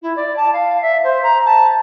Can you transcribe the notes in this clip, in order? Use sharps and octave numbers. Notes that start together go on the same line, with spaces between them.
E4
D5
A5
F5
E5
C5
A#5
A5